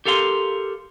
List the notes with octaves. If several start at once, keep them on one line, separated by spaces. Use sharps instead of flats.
G4 A4 A#4 F5 A#5 C6